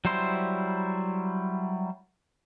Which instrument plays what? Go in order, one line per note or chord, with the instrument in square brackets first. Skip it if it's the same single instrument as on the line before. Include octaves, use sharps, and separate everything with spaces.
[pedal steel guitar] F#3 G3 E4 C5 C6